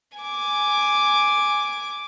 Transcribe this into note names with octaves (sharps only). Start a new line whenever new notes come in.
G#5 D6